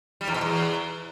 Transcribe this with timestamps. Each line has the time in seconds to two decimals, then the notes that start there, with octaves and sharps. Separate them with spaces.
0.21 G3
0.28 E2
0.34 B2
0.41 E2